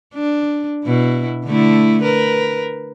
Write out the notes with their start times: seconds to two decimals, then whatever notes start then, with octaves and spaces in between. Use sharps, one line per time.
0.14 D4
0.84 B2 E4
1.45 D3 A3 E4
2.02 A#4 B4